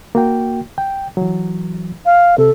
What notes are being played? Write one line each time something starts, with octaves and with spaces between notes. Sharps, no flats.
A#3 F#4 G5
G5
E3 F#3
F5
C3 A4